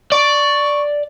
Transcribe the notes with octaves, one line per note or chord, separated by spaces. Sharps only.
D5 C#6